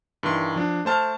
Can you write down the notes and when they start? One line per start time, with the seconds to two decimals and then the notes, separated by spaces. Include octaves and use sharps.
0.23 G2 D#3 E3 C6
0.56 F3 D4
0.85 A3 C5 A5 F6